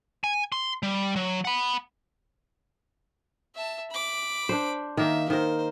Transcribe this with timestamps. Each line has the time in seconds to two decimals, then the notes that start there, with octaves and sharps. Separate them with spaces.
0.24 G#5
0.52 C6
0.83 G3
1.16 F#3
1.45 F#5 B5
3.55 E5 A5
3.91 B5 D6
4.49 D4 C5
4.97 D#3 A#3 E5
5.30 D#3 A#4 C5